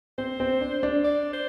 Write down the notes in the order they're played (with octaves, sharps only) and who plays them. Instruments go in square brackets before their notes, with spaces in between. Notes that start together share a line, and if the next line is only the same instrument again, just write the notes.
[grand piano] C4 [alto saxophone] C5
[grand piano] C4
D4
D4
[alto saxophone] D5
C5